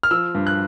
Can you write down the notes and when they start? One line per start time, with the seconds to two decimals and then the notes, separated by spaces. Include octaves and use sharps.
0.03 F6
0.11 F3 E6
0.35 G2
0.47 F#6